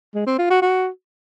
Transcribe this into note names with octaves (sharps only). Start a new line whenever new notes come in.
G#3
C4
F4
F#4
F#4